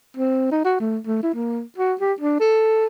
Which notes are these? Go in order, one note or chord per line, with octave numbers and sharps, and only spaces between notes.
C4
D#4
F#4
A3
A3
E4
A#3
F#4
G4
D4
A4